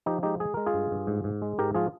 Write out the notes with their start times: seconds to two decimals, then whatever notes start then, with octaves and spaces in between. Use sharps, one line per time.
0.06 F3 D#4 G4
0.23 G#3 D#4 G4
0.40 G#3 G#4
0.54 G#3 A#4
0.66 F4 G#4
0.74 G2
0.91 G2
1.07 G#2
1.24 G#2
1.42 G#3
1.58 G#2 G4 A#4
1.74 F3 F4 G#4